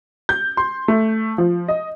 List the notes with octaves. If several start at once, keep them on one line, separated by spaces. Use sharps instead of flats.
G6
C6
A3
F3
D#5